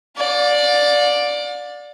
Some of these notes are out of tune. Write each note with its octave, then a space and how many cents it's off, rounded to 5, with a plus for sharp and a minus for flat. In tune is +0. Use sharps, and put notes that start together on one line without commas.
D5 +0 F5 +45